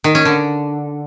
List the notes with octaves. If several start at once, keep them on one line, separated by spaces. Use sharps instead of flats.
D#3
C#4
D3